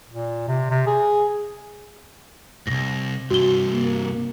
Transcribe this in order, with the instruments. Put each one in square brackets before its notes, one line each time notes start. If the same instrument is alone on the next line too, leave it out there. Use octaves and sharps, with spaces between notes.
[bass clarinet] A#2
C3
C3
G#4
[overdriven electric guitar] C2 G#2 [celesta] A#6
[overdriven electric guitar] C2 G2 [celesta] F#4 G7
[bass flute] A#3